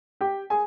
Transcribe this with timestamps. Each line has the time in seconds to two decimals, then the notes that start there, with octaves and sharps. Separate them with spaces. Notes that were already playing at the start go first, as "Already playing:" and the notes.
0.21 G4 G5
0.50 G#4 G#5